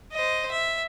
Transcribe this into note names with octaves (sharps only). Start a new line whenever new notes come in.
C5 D#5
E5